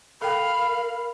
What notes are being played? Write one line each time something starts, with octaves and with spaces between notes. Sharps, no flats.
A4 A#4 F5 G5 B5